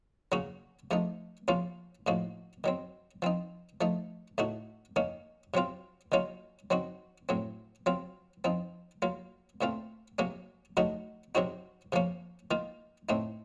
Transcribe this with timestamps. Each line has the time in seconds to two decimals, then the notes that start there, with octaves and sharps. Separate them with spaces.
0.32 C#3 F#3 A#3 C#4 F#4
0.91 C3 F3 A3 D#4
1.48 C3 F3 A#3 C#4 F4
2.07 A2 F3 A#3 D#4 F#4
2.64 D#3 F#3 C4
3.22 F3 C4 D#4
3.81 F3 A3 D#4
4.38 A2 A3 D#4 F#4
4.96 D#3 A#3 C#4
5.54 C3 F#3 C4 F4
6.12 D#3 F#3 A#3 C#4 F4
6.70 F#3 C4 D#4 F#4
7.29 A2 F#3 C4
7.86 F#3 C4 F4
8.44 F3 C4 D#4
9.02 F#3 A#3 F4
9.61 A#2 A3 C4 F4
10.19 C3 F#3 A#3 C#4
10.77 D#3 F#3 A3 D#4 F#4
11.35 C3 F#3 C4 D#4 F#4
11.92 C3 F3 A#3 C#4
12.51 D#3 A#3 F4
13.09 A2 A3 C4 D#4